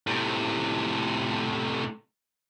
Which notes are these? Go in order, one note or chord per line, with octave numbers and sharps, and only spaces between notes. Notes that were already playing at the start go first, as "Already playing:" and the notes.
A2 C3